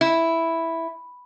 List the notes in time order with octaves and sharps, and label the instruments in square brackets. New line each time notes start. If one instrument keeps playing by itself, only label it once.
[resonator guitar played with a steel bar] E4